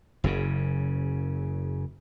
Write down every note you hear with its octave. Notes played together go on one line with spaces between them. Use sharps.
F#1 F#2 C#3